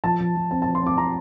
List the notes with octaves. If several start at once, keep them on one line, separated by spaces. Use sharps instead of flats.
F3 A5
F3
F3
C4 A5
A5
F3
C6
C4 D6
C4 A#5